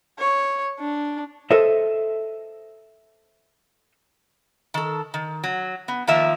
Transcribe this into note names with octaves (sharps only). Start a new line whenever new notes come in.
C#5
D4
A4 C5 D#5 E5
D#3 A4
D#3
F#3
B3
D#3 F3 A#3 E5